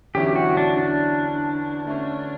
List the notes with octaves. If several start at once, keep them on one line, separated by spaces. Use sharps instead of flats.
E2 D3 F#3 C#4 E4 G4
F#4
D4
D4
D3 A3 C#4